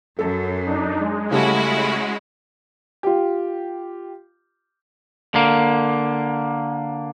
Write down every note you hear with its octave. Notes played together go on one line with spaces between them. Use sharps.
F#2 A4
D4 D#4
G#3
C#3 G3 A3 C#4 E4 F#4
F4 G4
D3 A#3